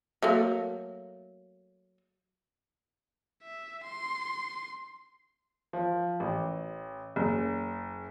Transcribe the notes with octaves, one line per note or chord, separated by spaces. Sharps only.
F#3 A3 A#3
E5
C6
F3
A1
F#1